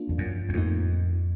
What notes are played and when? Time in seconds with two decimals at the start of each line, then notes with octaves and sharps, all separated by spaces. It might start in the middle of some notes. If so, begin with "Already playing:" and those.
Already playing: A#3 D4 F4
0.09 F2
0.18 F#2
0.49 E2
0.53 F2 A2 F3 A#3 D#4